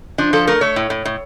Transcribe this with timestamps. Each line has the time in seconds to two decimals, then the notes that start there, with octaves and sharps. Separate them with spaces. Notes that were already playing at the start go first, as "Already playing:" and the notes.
0.18 F3 D4
0.33 F3 A4
0.47 A3 A#4
0.61 A3 C#5
0.76 A2
0.90 A2
1.05 A2